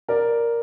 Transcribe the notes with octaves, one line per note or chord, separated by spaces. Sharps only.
A#4 D5